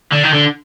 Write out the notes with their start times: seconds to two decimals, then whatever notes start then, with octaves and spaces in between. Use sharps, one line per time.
0.12 D3
0.23 D#3
0.33 D3